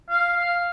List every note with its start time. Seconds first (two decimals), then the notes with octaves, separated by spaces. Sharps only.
0.09 F5
0.36 F5